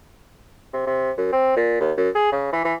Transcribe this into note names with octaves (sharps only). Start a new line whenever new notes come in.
C3
C3
F#2
C4
A#2
D#2
F#2
G#4
C#3
E3
E3